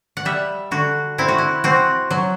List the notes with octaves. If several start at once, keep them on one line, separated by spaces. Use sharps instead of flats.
F#5
G3 E5
D3 F#4
C4 E4
F#4
E4
C4 F#4
F#3